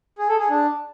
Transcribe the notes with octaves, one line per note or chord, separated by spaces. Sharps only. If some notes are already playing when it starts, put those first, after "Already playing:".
G#4
A4
G#4
D4